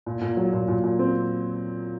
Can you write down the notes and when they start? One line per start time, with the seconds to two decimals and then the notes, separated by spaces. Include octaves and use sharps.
0.06 A#2
0.21 A#2
0.37 F#3
0.53 A#2
0.68 A#2
0.84 A#2
0.99 C4